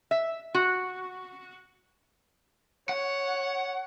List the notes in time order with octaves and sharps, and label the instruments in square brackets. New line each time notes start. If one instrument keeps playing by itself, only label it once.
[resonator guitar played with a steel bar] E5
F#4
[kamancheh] C#5 [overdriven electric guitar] F#5